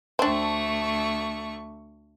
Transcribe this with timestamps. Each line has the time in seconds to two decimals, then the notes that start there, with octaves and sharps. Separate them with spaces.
0.19 D2 A3 C4 D4 C#6